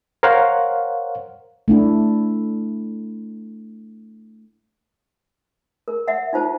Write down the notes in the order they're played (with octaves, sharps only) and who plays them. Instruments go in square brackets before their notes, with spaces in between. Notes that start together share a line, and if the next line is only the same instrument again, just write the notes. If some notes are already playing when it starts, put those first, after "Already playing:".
[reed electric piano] A#4 C5 C#5 F5 F#5
[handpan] A3 D4 E4
[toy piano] A#4
E5 F#5
D#4 F4 C5 A5